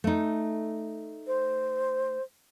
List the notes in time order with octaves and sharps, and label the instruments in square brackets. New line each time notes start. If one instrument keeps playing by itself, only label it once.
[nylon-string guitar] A3 D#4
[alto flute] C5